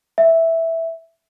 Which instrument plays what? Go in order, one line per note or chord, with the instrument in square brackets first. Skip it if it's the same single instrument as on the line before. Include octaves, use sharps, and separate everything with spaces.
[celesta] E5